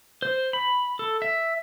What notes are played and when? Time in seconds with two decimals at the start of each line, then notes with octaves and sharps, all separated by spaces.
0.22 C5
0.53 B5
0.99 A4
1.22 E5